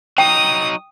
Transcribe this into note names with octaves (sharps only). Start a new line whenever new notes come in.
F#3 D#4 G5 D#6